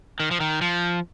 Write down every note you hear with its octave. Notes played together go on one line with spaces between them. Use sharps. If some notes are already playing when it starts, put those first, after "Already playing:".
D#3
F3
D#3
F3